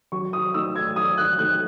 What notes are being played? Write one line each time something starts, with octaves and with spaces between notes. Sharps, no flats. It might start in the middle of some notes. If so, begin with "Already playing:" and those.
F#3 C#6
D#6
A3 D#4 E6
G#6
F#3 D#6
F#6
A3 D#4 F#6